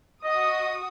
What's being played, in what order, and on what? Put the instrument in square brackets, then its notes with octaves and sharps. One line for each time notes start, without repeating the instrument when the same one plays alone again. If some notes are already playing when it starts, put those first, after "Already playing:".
[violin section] F#4 D#6 [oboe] D#5